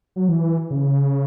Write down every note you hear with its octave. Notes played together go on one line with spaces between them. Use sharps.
F#3
E3
C#3